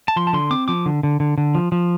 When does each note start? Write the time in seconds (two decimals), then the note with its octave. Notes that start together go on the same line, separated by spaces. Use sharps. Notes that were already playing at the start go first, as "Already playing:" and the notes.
0.08 A5
0.16 F3 C6
0.27 A5
0.33 D3 C6
0.51 C4 D6
0.68 F3 D6
0.86 D3
1.03 D3
1.20 D3
1.38 D3
1.55 F3
1.72 F3